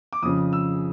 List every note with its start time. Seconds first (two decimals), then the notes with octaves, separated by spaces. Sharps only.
0.13 D6
0.22 F2 C#3 F3 D#6
0.53 E6